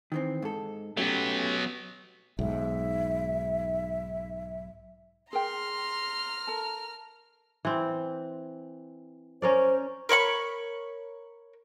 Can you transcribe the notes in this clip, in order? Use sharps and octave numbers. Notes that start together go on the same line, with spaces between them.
D#3 E3 C4
G#2 A4
F#3 A3 B3 C#4 G4
B1 G#2 E5
G#4 A#4 G5 A#5 C6 F6
A4 A#4 A5
E3 C4
C#4 A#4 C5 D5
A#4 C#5 B5 C#6